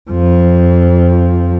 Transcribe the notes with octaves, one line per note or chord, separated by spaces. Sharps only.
F2 F3